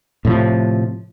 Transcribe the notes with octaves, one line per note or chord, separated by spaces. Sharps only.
A2 C3 F3